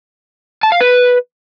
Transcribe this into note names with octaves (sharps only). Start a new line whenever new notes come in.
A5
F5
B4